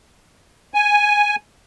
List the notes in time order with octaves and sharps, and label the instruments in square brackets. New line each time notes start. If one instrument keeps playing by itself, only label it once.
[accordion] G#5